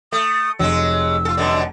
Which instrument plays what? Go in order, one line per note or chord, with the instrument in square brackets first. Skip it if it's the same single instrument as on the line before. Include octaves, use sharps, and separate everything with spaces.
[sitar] A3 [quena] D#6
[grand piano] F1 [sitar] F#3 G#3 [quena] E6
[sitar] F4 A4
F#2 B2 D3